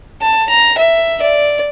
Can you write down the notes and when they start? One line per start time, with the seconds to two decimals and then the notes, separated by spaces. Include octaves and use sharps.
0.21 A5
0.50 A#5
0.78 E5
1.22 D5